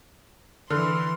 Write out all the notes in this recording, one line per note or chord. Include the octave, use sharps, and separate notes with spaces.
D3 E3 C6 F6